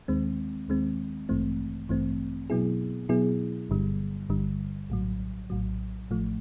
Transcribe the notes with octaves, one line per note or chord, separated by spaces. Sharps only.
D#2 D#3 G#3 C4
D#2 D#3 G#3 C4
A1 G2 E3 A3 C4
A1 G2 E3 A3 C4
B2 F#3 B3 E4 G#4
B2 F#3 B3 E4 G#4
G1 G2 D3 G3
G1 G2 D3 G3
A#1 A2 F#3
A#1 A2 F#3
A1 A2 F3 A3